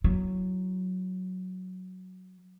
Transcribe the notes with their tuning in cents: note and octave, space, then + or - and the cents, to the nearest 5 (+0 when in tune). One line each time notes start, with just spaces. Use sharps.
F#3 +0 E4 +0